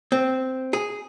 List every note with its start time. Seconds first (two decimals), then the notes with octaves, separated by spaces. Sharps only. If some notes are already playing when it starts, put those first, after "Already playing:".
0.12 C4
0.73 G#4